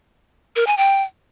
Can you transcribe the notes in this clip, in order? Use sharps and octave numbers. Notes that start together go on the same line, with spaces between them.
A#4
G#5
G5